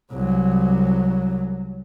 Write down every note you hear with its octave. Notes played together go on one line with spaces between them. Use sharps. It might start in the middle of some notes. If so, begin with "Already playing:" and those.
C2 F#3